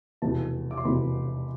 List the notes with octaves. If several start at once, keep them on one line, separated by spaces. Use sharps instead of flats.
F1 E2 B2 A5
D6
C6
F1 E2 B2 B5